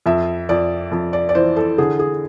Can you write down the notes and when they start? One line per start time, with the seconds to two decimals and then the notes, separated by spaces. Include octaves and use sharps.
0.06 F2 E5
0.49 F2 D5
0.92 F2
1.13 D5
1.29 D5
1.35 E3 C5
1.56 A4
1.78 D3 G#4
1.99 G#4